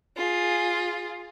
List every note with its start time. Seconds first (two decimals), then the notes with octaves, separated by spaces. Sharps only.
0.17 F4 G#4